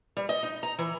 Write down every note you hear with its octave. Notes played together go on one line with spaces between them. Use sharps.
G3
D#5
D#4
A#5
E3